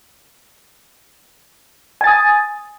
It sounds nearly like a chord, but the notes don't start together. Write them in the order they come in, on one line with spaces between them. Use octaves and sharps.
G#5 A6 D#6